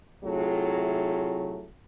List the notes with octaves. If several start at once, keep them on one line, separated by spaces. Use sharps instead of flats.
A2 C3 F#3 A3 F4 G#4